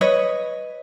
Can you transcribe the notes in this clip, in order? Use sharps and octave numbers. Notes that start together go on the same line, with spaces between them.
B4 C#5 D#5